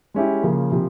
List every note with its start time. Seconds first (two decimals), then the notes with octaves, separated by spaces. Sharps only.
0.14 G#3 C#4 E4 G4
0.43 C#3 F3 A#3
0.72 C3 F3